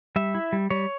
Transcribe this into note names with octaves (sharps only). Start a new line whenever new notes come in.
G3 E5
E4
G3
G3 C#5